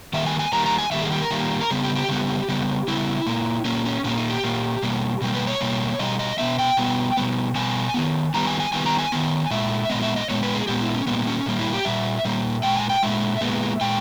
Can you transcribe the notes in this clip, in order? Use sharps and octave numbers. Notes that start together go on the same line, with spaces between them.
D#3 G3 A#3 E5
G#5
G#5
D#3 G3 A#3 A#5
A#5
G#5
D#3 G3 A#3 E5
G#4
G4
A#4
D#3 G3 A#3
A#4
C#3 G3 B3 G#4
G4
G4
C#3 G3 B3
C#3 G3 B3
C#3 G3 B3 E4
A#2 A#3
A#2 A#3 C#4
C#4
A#2 A#3 C#4
D#4
G4
A#2 A#3
B2 G3 A#3
B2 G3 A#3
B4
C#5
B2 G3 A#3
B2 G3 D#5
D#5
B2 G3 B3 E5
G5
B2 G3 B3
B2 G3 B3
B2 G3 B3 G#5
D#3 G3 B3
D#3 G3 B3 A#5
G#5
G#5
D#3 G3 B3 G#5
A#5
G#5
D#3 G3 B3
A#2 G#3 E5
A#2 G#3 B3 D#5
E5
D#5
A#2 G#3 B3 C#5
B4
G#4
A#2 G#3 B3 G4
E4
C#4
A#2 G3 A#3 B3
C#4
A#2 G3 A#3
E4
G4
A#2 G3 E5
A#2 G3 A#3
A#2 G#3 G5
G#5
G5
A#2 G#3 E5
A#2 G#3 B3
A#2 G#3 G5